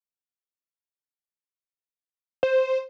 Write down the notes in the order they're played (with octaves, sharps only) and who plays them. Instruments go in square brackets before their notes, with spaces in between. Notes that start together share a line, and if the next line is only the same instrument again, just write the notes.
[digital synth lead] C5